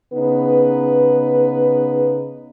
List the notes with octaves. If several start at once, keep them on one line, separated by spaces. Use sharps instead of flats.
C#3 B3 D#4 B4